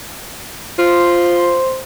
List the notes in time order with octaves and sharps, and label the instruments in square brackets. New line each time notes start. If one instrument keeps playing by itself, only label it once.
[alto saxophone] F4 [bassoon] C5